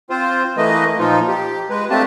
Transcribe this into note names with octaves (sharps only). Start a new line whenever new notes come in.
C4 F4 C5
E3 A3 A#3 B4 D#5
A#2 F3 D#4 F4
G4
G#3 B4
A3 A#3 C4 D4 G4 A5